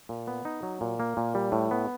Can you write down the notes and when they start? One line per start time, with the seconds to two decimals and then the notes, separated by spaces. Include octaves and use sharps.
0.09 A#2
0.27 B3
0.45 D#4
0.63 F#3
0.81 A#2
1.00 A#3
1.17 A#2
1.35 G3
1.52 A2
1.71 B3